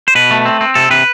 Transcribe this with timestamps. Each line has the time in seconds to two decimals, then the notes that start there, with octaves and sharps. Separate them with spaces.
0.08 C5
0.15 B2 B4
0.31 A3
0.45 C4
0.61 C4
0.75 C3 A4
0.91 C3 B4